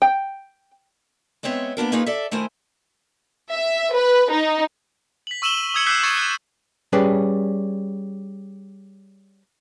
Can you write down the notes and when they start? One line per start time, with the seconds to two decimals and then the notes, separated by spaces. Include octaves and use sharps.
0.02 G5
1.43 G#3 B3 C4 C#5 E5
1.77 A#3 B3 D4 A#4
1.92 A#3 C#4 D#4 F4 G#4 B4
2.06 A4 D5 E5
2.31 D#3 A3 E4 A#4 C5 G#5
3.51 E5
3.94 B4
4.31 D#4
5.27 B6 F#7
5.42 C#6 E6 D#7 E7 F#7 G7
5.74 D#6 E6 G#6 C#7 F#7
5.86 D6 E6 F#6 G6 B6 C7
6.03 C#6 G#6 A6 C#7 E7
6.17 F#6
6.93 G3 C#4 G#4 B4 D5